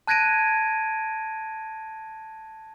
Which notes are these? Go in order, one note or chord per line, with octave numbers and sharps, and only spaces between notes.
A5 F#6 G#6 A#6 D7 D#7